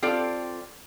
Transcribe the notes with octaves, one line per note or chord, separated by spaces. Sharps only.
C4 F4 G4 A4 D5